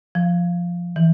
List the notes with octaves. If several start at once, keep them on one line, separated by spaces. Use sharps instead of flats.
F3
E3